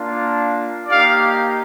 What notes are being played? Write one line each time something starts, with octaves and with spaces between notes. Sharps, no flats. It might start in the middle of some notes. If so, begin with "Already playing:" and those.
Already playing: A#3 D4 F4
A#3 D#4 G4 D5 F5